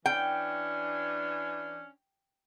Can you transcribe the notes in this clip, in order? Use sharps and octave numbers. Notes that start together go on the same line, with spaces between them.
E3 C#4 D4 G5